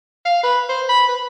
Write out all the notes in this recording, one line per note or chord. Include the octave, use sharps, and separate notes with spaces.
F5
B4
C5
B5
B4